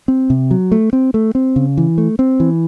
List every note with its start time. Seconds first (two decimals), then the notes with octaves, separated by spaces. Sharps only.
0.08 C4
0.30 C3
0.51 F#3
0.72 A3
0.93 C4
1.14 A3
1.35 C4
1.56 C#3
1.77 E3
1.98 A3
2.19 C4
2.40 E3